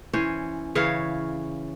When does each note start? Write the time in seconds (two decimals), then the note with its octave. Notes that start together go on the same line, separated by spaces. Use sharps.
0.13 E3 C#4 C5
0.75 C#3 E3 C#5 F5